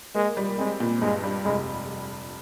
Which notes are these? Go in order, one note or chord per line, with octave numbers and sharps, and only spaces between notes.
G#3 A#3
G3
G#3 C4
A#2
G2 G#3
G3
F1 G#3